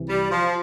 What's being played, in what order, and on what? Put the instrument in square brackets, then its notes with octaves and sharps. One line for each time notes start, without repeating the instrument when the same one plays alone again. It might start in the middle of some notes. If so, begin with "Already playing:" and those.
Already playing: [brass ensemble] C2 C3 E3
[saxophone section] G3
F3